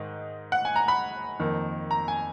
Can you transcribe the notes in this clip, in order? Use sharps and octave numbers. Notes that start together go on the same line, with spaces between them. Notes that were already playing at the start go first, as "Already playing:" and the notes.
Already playing: G#2 D#3 D#4
F#5
G#5
A#5
B5
F2 D#3 A#3
A#5
G#5